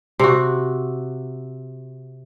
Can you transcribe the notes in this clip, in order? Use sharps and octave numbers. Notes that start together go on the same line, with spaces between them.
C3 F#4